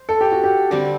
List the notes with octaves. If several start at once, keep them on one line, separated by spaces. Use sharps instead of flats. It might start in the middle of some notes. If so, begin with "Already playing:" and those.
Already playing: C5
A4
G4
F#4
G4
D3 G3 C4 G4